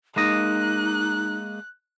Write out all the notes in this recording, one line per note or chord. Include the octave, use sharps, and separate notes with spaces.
G#3 A#3 D#4 D#5 F#6